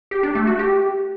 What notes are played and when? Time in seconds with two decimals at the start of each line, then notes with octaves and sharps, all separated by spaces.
0.11 G4
0.23 D4
0.35 A3
0.47 F#4
0.59 G4